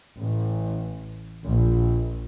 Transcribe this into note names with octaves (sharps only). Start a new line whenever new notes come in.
A1
A#1